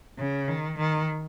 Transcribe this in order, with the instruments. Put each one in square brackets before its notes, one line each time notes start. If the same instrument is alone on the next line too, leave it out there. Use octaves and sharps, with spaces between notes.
[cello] C#3
D#3
D#3